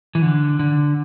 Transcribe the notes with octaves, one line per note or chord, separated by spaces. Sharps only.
E3
D3
D3